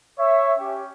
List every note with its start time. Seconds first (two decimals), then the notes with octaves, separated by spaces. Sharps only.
0.19 C#5 E5
0.58 C#4 G4